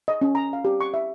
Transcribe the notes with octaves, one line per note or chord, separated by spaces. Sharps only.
D#5
C#4
A#5
F5
G4
C#6
E5